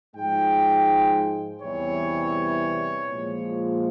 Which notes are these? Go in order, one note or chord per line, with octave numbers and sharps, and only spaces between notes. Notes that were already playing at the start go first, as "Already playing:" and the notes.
G#2 F3 G#3 G5
E2 C3 E3 G3 C#5
A#2 F3 G#3